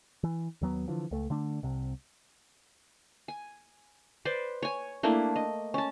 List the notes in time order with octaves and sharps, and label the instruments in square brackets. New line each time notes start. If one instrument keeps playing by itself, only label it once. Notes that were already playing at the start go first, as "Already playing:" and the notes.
[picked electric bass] E3
D#2 F#3 B3
D3 E3 F3
C#2 A3
D3 A3 D4
C2 C3
[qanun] G#5
B4 C5 D5
C#5 G#5
A3 A#3 D4 E4
D#5
C#4 A5